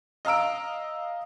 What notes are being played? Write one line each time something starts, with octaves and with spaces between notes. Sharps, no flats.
D#5 F5 A#5 E6 D7